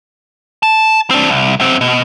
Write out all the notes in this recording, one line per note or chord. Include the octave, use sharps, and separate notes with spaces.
A5
C4 D4
C2
F#2 C4
B2